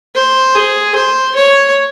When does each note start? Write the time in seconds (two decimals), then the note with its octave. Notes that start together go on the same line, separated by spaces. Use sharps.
0.15 C5
0.55 G#4
0.95 C5
1.36 C#5